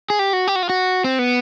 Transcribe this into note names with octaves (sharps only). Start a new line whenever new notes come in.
G#4
G4
F#4
G4
F#4
F4
F#4
C4
B3